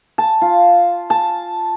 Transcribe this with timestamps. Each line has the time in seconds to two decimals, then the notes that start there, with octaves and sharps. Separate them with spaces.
0.18 A5
0.41 F4
1.10 A5